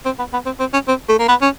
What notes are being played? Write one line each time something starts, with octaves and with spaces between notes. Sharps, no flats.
C4
B3
B3
C4
C4
C#4
C4
A3
A#3
B3
C#4